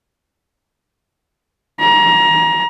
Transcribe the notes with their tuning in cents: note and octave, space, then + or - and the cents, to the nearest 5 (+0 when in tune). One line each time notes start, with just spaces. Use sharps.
A#5 +25